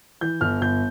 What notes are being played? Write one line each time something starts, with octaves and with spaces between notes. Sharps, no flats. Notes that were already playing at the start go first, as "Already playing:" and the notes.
E3 G6
G1 F6
G1 G6